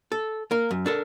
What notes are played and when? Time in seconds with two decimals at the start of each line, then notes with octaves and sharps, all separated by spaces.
0.12 A4
0.51 A#3 A#4
0.71 F#2
0.86 D4 A4 A#4